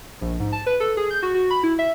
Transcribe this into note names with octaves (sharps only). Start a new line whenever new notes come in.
A#1
G#2
A5
B4
A4
G#4
G6
F#4
F#4
B5
E4
E5